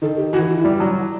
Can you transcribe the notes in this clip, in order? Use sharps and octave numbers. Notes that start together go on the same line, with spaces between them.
D#3 A4
G4
E3 F#4
E4
G3
F#3